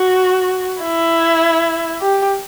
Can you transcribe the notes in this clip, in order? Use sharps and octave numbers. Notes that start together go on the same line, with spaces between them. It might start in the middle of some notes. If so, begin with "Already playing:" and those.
Already playing: F#4
E4
G4